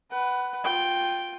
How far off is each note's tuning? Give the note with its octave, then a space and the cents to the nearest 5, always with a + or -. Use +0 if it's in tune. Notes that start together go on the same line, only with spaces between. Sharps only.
B4 +0 F#5 +25
F4 +15 G5 +0